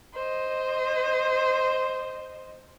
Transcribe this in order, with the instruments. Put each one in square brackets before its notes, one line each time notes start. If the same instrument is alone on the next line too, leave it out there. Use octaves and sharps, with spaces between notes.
[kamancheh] C5 D#5